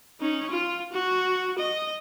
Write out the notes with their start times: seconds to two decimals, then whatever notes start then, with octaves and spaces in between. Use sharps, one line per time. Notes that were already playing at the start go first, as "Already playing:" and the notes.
0.20 C#4 D#4
0.50 F4
0.92 F#4
1.58 D#5